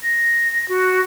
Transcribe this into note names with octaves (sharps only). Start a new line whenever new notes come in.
A#6
F#4